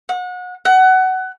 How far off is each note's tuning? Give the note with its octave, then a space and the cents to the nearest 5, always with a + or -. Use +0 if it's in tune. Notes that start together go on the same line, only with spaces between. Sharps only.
F#5 -30
F#5 +20